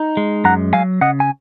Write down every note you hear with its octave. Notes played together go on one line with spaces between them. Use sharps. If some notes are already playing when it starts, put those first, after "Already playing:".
Already playing: D#4
G#3
F#2 F#5 A#5
F#3 F5 G#5
C#3 D#5 F#5
G#5